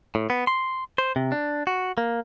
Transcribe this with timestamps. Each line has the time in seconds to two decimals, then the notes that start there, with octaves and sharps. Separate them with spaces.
0.15 A2
0.30 B3
0.47 C6
0.98 C5
1.16 C3
1.32 D4
1.67 F#4
1.98 A#3